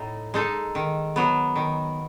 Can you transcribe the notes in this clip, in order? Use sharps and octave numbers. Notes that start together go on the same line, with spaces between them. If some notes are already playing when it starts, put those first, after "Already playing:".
Already playing: A2 D#4
G#3 D#4 A4
D#3
F#3 B3
D#3